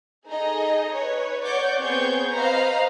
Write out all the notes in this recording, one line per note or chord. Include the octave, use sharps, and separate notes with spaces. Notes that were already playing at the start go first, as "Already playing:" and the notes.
D#4 G#4 A4 D#5 A#5
B4 C#5
C#5 D5 F#5 C#6 D6 G6
B3 C4 G#4 C#5 C#6 G6
B4 C5 D#5 F5 A#5 B5